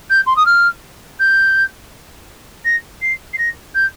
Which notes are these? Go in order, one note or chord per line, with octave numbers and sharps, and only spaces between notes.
G6
C6
D#6
F6
G6
A#6
C7
C7
A#6
G6